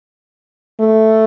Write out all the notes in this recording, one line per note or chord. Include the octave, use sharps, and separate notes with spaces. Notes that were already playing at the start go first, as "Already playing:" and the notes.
A3